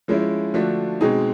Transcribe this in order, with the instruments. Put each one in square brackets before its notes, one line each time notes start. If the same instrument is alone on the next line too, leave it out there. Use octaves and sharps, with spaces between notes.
[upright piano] F3 G#3 C#4 E4
D3 F3 A3 D4 F#4
B2 G#3 C4 D#4 G#4